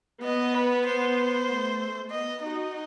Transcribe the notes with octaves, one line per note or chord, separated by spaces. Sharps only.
B3 D#5
B4
C5
A3
B3 D#5
D#4 F#4 D#5